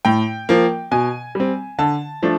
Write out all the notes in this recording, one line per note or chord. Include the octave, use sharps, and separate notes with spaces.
A2 G5
F3 A#3
B2 G#5
G3 C4
D3 A5
F3 A3 D4